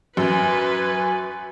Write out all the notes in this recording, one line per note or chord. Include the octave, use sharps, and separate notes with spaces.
F#2 F#4 B4 G#5